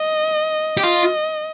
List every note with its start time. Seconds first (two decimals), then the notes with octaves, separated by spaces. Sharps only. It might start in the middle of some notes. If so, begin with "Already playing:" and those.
Already playing: D#5
0.77 G4
0.83 F4 D#5